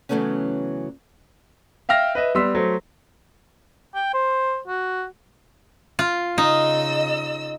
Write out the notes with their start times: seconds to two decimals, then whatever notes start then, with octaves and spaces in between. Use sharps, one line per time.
0.09 C#3 E3 F#3 A3 B3 C#4
1.89 E5 F5 G5 F6 A#6
2.15 B4 D#5 E5
2.35 G3 B3 C6 E6 B6
2.55 F#3 A3 C5
3.95 G5
4.14 C5
4.67 F#4
5.99 F4
6.38 C#3 D#4 D#5 E6